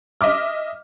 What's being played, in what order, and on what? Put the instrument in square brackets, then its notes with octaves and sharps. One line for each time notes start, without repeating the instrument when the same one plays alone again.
[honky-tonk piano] D#5 E5 D6 F6